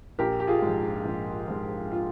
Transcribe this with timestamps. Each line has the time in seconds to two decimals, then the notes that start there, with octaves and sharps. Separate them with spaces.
0.19 A#1 G4 A#4
0.40 G4
0.47 F4 G#4
0.62 G#2 F3
1.05 A#1
1.48 G#2 F3
1.92 F4